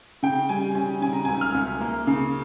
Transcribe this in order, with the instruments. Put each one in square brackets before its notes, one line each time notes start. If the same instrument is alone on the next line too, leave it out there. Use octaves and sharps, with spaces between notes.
[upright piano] C#3 G5
G3 G#5
C#4 G#5
C#3 G#5
A#5
C#2 G#5
F6
C#2
A#3
C#3